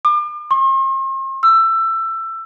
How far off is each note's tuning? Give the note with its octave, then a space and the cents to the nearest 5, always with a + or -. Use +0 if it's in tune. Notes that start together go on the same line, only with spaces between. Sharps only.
D6 +40
C6 +45
E6 +20